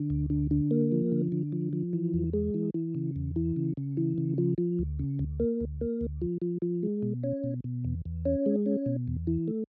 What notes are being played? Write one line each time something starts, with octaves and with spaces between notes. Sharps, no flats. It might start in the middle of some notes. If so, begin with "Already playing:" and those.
Already playing: D3
D2
D3
D3
A#3
F3
D3
D3
F3
F3
E3
E2
G#3
E3
E3
C#3
E2
E3
C#3
C#3
E3
C#3
F3
F3
D2
C#3
D2
A#3
D2
A#3
D2
F3
F3
F3
G#3
B2
C#4
B2
B2
E2
E2
C#4
G#3
C#4
B2
E2
E3
A3